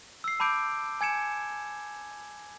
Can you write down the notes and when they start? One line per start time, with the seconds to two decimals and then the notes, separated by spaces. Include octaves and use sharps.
0.24 E6 C7
0.40 A5 B5 D6 G6 D7
1.01 G#5 G#6 C#7 E7